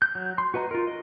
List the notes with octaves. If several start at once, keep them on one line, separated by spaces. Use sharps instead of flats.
G6
F#3
C6
F#4 B4 D#5 A#5
F4 A#4
D#5